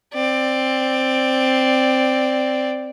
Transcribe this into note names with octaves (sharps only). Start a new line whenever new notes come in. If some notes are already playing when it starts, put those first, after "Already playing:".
C4 D5